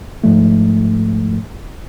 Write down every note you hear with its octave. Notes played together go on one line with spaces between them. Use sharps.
G#2 F3 A3